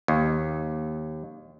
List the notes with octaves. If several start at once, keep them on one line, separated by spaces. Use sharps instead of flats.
D#2